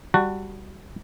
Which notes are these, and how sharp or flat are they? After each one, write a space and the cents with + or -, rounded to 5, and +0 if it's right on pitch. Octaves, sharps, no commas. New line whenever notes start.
G3 +0 F#4 +0 A5 +30